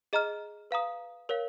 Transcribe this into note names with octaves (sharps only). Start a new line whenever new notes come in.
G#4 D#5 A#5 F6
B4 F5 A#5 D#6
A#4 C#5 F5